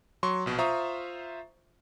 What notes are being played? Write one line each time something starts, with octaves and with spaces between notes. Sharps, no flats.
F#3 C6 C#6
A#1 B2
F4 C5 E5 A#5 C#6 D#6